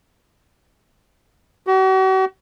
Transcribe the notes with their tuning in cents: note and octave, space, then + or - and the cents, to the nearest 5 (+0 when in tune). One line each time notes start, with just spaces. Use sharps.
F#4 +40